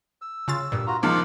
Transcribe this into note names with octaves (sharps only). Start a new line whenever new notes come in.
E6
C#3 F4 A6
G2 A#2
F4 F#4 A#5
C#2 D#3 F3 C5 F5 D6